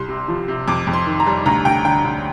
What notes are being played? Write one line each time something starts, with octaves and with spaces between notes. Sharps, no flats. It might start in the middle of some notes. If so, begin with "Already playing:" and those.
Already playing: C2 C6
C3
F3
C3
F2 D6
F2
C6
D#3
A#5
G3
D2 A#5
D2 G5
D3 G5
D2